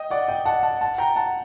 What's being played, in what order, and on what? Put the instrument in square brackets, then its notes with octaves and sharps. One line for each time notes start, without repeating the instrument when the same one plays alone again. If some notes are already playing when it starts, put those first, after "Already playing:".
Already playing: [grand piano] D#5 G5
D5 F#5
D#5 G5
F#5 A5
F#5 A5
F#5 A5
G5 A#5
F#5 A5